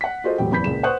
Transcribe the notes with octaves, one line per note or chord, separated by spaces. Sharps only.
F#5 B6
F4 F#4 G#4 A4 C5 D#5
E1 A2 F#3 G4 G5
F#1 E2 B5 G6 B6
C#2 A#2 G#4 E7
B4 C5 F#5 C#6 D#6 F#6